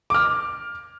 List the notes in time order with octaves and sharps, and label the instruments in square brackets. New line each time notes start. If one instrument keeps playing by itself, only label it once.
[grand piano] D6 F6